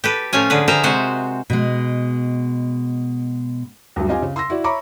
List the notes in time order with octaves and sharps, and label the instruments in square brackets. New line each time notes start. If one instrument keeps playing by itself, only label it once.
[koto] G4 A4 B4
A2 F3 C#4 F4 G#5
D3 G#4 B4
G#4 A#4 C5 E5
C3 G#3 F#4 C5
[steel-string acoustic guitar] B2 G#3
[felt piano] D2 G2 F#3
C4 F4 G4 D#5 F5 G#5
C#3
C6 E6 A#6
E4 F#4 D5
C#5 E5 A#5 B5 C#6 D6